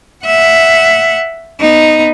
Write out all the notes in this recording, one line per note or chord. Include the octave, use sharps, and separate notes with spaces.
E5 F#5
B3 D#4